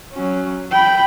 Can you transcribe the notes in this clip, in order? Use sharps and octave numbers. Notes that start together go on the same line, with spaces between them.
F#3 C#4
G5 B5